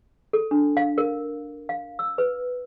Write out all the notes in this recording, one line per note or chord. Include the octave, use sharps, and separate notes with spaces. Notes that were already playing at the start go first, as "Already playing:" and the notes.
A4
D4
F5
A#4
F5
E6
B4